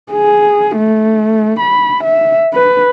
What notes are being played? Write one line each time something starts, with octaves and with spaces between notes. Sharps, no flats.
G#4
A3
B5
E5
B4